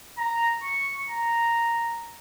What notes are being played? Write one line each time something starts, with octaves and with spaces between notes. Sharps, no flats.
A#5
C#6
A#5